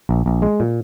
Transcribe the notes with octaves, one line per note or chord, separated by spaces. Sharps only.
A#1
A#1
G#3
A#2